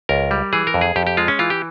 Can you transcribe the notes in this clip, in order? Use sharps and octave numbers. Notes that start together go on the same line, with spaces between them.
C#2 A#4
G3
E3 G#4
A#4
F2
G#4
F2 G4
G4
G#3 F4
C#4
E3 F4
G4